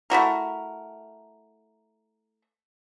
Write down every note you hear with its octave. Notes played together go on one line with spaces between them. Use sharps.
A3 E4 F#4 A#4